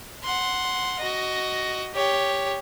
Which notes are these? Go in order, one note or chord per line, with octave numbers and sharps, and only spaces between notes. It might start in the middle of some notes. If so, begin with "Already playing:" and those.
F#5 C6
F#4 D#5
G4 C#5